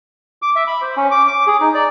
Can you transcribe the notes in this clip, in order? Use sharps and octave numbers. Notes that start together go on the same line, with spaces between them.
D6
E5
B5
C5
C#4
D6
D6
G#4
D#4
D5